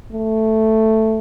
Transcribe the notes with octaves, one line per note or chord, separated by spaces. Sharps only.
A3